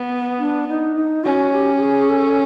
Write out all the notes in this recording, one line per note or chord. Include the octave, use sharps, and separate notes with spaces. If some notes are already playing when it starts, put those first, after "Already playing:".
Already playing: B3
D4
D#4
D#4
C#4 F#4
G4
G4
G#4
A4